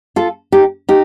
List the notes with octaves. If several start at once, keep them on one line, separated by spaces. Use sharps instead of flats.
F4 A4
D#4 G4
D#4 G4